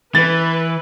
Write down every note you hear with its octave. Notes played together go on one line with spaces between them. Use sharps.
E3 B4 A6